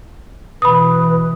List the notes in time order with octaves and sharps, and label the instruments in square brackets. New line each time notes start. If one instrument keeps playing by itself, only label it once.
[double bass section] B2 E3 [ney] B4 [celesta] B5 D#6